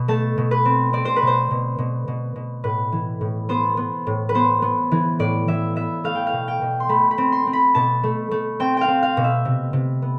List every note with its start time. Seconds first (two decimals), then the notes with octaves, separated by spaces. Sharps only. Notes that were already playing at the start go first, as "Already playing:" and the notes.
Already playing: B2
0.08 A3 A5
0.38 B2
0.51 B4
0.65 C4
0.93 C4 D5
1.05 C5
1.16 B4
1.22 B2 C5
1.51 B2
1.78 B2
2.08 B2
2.36 B2
2.64 A2 B4
2.92 E3
3.21 A2
3.49 B3 C5
3.77 B3
4.07 A2
4.29 B4
4.35 B3 C5
4.62 B3
4.92 E3
5.19 A2 D5
5.48 E3 E5
5.76 B3 E5
6.04 A3 F5
6.15 G5
6.27 F5
6.33 B2
6.48 G5
6.62 B2
6.80 C6
6.89 A3 B5
7.11 B5
7.18 C4
7.32 C6
7.47 C4
7.53 B5
7.75 B2 A5
8.03 A3
8.31 A3
8.60 C4 G5
8.77 F5 G5
8.88 C4
9.02 F5
9.17 B2
9.24 E5
9.45 C3
9.73 C3
10.02 B3